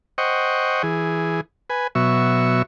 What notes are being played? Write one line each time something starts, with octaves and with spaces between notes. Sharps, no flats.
C5 D#5 F#5 G5 C#6
E3 G#4
B4 G#5
B2 F#3 E5 C#6